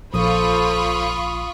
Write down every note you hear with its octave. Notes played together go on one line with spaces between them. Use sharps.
A#1 F4 A4 C5 B5 C#6 D#6